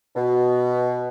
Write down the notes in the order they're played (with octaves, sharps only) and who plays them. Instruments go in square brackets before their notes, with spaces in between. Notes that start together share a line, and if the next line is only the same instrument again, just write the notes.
[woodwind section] B2